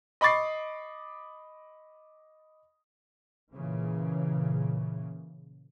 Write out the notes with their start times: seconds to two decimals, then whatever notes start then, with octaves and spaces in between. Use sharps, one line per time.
0.21 D#5 B5 C#6 D6 A6 C7
3.54 A#2 C#3 E3